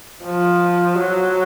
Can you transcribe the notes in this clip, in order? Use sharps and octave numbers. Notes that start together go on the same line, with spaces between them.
F3
F#3